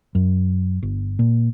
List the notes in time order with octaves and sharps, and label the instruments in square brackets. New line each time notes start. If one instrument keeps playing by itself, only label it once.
[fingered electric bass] F#2
G1
A#2